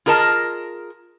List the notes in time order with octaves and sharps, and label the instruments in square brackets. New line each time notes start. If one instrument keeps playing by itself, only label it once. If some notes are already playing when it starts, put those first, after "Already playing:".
[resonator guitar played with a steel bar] F4 G#4 A#4 D#5 A5